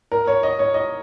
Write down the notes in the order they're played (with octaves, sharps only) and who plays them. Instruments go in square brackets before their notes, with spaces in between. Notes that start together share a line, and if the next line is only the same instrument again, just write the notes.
[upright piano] A#4
C#5
D#5
C#5
D#5